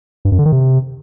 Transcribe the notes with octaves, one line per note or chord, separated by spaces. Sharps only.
G2
F#2
D3
D#3
C3